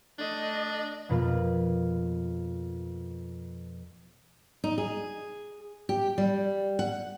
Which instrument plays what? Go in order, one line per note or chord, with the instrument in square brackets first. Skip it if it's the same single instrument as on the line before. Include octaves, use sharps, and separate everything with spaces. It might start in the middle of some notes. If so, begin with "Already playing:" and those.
[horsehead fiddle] A3 D#5 [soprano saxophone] D4
[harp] F2 B2 A#3 F4 B4
[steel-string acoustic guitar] D#4
G#4
G4
G3
F#5